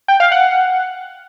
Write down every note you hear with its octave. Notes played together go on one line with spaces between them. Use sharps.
G5
F5
F#5